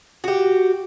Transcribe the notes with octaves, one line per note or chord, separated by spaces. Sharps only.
F#4 G4